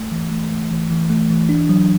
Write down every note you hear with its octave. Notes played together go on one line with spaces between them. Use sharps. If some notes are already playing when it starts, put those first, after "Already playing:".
Already playing: A3
E3
A3
A3
E3
E3
A3
E3
D4
F#3